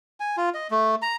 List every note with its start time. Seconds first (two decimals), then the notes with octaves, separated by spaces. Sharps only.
0.20 G#5
0.37 F4
0.54 D#5
0.71 A3
1.02 A#5